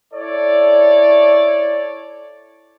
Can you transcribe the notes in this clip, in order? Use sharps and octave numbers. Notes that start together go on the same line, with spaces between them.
E4 A4 C#5 D5